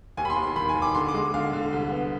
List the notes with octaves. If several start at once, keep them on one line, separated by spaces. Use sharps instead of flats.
D#2 G#5
B5
C6
D#2
C6
D#3 B5
G#5
D#2
D6
D3 C6
D6
G#3
D3 F5
D3
C2
B3